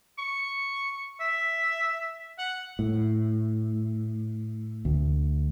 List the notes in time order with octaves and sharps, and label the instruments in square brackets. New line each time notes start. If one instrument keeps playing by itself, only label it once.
[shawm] C#6
E5
F#5
[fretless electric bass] A2
D2